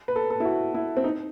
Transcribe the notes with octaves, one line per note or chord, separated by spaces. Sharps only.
B4
A4
A4
E4
F#4
E4
C4
D#4